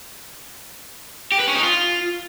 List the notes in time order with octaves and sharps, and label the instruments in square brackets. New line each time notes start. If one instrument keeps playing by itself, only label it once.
[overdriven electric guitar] G4
B4
C#4
D#4
F4